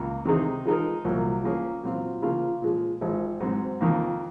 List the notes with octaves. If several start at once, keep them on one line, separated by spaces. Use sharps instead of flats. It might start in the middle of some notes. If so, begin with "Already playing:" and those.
Already playing: C#2 A#3
C3 D#3 G#3 D#4 G#4
F3 G#3 D#4 A#4
C2 A#2 F#3 A#3
F3 A#3 C#4 G#4
A#2 F#3 C4 F4
C#3 F3 A#3 F4 A#4
A#2 F3 G#3
G#1 G#2 F3
G#2 F#3 C4
F2 D#3 A#3